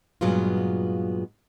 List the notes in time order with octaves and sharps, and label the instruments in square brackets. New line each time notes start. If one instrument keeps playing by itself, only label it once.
[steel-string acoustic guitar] G2 A#2 F#3 G#3 B3 F4